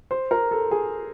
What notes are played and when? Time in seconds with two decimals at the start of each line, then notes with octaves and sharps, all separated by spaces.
0.11 C5
0.31 A#4
0.51 A4
0.71 G#4